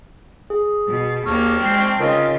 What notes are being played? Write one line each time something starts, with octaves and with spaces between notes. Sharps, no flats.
G#4
B2
D#2 A#3 A5 C#6 F6
G#3 C4
C#3 D#4 F4 A#4 D#5